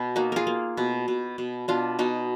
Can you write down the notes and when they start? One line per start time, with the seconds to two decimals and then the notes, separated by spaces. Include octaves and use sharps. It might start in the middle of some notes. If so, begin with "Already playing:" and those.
Already playing: B2
0.16 A#3 D#4 F#4
0.32 F4 G#4 A#4
0.47 A#3
0.77 B2
1.08 B2
1.38 B2
1.68 B2 D4 F4
1.99 B2 D#4 F#4